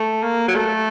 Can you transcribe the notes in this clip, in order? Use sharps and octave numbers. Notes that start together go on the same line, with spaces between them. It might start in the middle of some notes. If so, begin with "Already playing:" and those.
Already playing: A3
A#3
F#3
A3